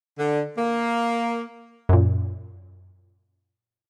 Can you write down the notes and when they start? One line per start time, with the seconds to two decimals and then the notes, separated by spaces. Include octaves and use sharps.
0.18 D3
0.57 A#3
1.89 F#2 A#2